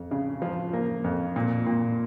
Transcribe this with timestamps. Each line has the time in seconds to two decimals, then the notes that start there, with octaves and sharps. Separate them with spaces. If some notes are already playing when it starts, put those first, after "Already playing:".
Already playing: F2
0.11 C#3
0.42 F3
0.73 A#3
1.04 F2
1.36 A#2
1.67 A#2